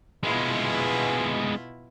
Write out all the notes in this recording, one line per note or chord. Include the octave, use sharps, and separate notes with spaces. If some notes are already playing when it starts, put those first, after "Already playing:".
B2 G#3 B3 E4 F4